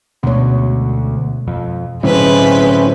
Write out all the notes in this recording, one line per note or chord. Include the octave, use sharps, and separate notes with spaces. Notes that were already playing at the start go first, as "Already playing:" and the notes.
D2 B2 G#3 C#5
F2
A2 D3 F#3 G#3 C4 C#4 E4 B4